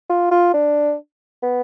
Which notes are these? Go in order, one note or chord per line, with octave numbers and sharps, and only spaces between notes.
F4
F4
D4
B3